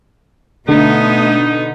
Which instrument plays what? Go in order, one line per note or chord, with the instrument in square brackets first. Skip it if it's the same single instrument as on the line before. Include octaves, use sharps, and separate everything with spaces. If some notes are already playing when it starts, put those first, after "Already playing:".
[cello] B2 B3 [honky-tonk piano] D3 [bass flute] A3 [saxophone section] D#4